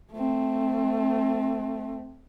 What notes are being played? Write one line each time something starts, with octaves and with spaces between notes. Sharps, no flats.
A3 C4